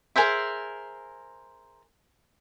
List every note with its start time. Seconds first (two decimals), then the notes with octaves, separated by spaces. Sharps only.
0.16 G#4 A#4 C5 E5